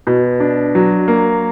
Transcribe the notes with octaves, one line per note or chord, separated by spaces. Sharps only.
B2
D4
F#3
A#3